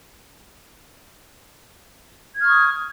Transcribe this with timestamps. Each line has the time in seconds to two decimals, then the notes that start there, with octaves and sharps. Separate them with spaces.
2.34 G#6
2.39 F6
2.44 C#6
2.49 D#6